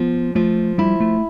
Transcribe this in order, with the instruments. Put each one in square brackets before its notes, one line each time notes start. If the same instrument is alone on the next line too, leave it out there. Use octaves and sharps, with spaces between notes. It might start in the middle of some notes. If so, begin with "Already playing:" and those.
Already playing: [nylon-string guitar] F3 [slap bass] B3
[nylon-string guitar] F3 [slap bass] A3
[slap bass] G3 [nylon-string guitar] E4
[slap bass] A3